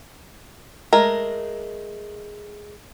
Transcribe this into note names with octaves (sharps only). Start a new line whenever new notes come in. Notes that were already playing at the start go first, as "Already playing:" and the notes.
G#3 A3 A#4